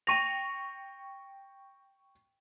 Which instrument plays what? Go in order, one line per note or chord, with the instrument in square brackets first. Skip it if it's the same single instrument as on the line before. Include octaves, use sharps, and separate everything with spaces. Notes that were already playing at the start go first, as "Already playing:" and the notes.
[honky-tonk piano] G5 C#6 F7 [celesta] A#6 D#7